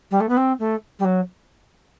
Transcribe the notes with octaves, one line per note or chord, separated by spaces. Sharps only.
G3
A3
B3
C4
A3
G3
F#3